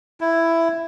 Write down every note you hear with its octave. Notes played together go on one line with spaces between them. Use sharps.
E4